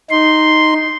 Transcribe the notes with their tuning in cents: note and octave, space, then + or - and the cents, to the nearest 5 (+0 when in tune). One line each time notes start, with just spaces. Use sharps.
D#4 +0 C6 +0